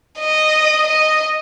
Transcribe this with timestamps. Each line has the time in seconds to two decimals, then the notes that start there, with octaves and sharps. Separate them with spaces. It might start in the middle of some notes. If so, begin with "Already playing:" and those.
0.20 D#5
0.87 D#5